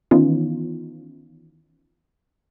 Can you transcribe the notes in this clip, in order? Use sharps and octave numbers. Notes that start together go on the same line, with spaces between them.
D#3 E3 B3 C#4 D#4 F4